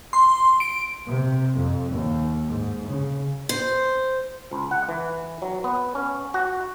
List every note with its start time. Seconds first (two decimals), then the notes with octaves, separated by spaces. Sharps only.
0.13 C6
0.60 D7
1.09 C3
1.56 F2
1.94 D#2
2.48 G#2
2.88 C#3
3.49 C5
4.51 C#2
4.71 F#5
4.89 E3
5.42 F#3
5.64 B3
5.95 C#4
6.34 F#4